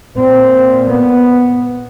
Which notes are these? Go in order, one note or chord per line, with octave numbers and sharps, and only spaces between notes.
A#2 C4
B3